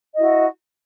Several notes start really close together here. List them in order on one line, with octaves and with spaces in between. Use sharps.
D#5 E4 F#4